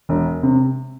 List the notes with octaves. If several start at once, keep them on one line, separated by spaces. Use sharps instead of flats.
E1
C3